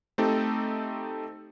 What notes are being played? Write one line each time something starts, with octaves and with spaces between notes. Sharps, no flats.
A3 C4 D#4 G4 A4